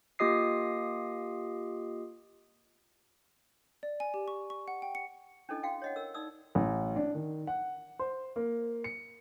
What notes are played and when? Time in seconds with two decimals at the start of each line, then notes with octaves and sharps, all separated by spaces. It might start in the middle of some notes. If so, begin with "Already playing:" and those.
0.19 A#3 F4 G4 D#5 D#6 C7
3.83 D5
4.00 G#5
4.14 G4
4.28 C#6
4.50 C#6
4.68 F#5
4.82 G5
4.95 C#7
5.49 C#4 D4 E4 A4 D#5
5.63 F#4 F5 G5
5.82 C#5 D#5 F#5
5.96 A#4 E6
6.14 D#4 D5 D#6 E6
6.55 A1
6.96 D4
7.14 D#3
7.47 F#5
7.99 C5
8.36 A#3
8.84 C#7